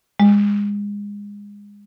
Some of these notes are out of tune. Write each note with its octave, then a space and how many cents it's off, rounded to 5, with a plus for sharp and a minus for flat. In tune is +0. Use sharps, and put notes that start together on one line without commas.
G#3 -25